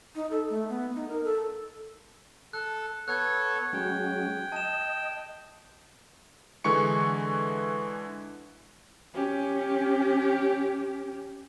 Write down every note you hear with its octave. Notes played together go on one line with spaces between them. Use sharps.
D#4
A4
A3
B3
D#4
A#4
A4
A4 F#6
B3 A4 C#5 F#6 G#6
F#3 G#3 C#4 G5
D#5 A5 E7
D3 E3 G#3 C#6 C#7
C#4 G4